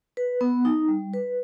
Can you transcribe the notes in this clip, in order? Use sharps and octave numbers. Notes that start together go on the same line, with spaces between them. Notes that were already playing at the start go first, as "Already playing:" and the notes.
B4
B3
D#4
G3
B4